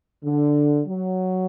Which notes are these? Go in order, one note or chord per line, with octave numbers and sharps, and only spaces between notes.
D3
F#3